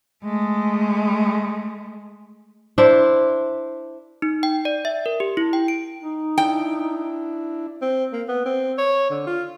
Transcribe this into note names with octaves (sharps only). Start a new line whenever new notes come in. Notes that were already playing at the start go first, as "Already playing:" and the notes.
G#3 A3
D4 E4 C5
D#4
G5
D5
E5
A#4
G4
E4
G5
D7
D#4
D4 E4 G5
C4
A#3
B3
C4
C#5
D3
F4